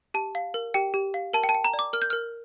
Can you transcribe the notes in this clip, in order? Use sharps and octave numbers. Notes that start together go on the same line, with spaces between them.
G4 A5
F5
A#4
G4 G5
G4
F5
A#4 A5
G5
A5
G5
A#5
D5
D6
A#4 F6
G6
A#4 F6